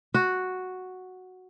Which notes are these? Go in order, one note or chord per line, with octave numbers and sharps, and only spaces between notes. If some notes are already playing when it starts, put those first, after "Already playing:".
F#4